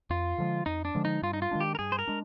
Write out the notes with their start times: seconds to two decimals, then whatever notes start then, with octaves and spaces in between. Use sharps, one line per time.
0.10 F2 F4
0.38 D3 F3 G#3
0.66 F2 D#4
0.85 D4
0.95 D3 F3 G#3
1.05 D#4
1.22 G2 F4
1.33 D#4
1.42 F4
1.51 D#3 G#3 D4
1.60 G4
1.75 A#4
1.79 G2 G#4
1.92 C5
1.99 A#4
2.08 G#3 D4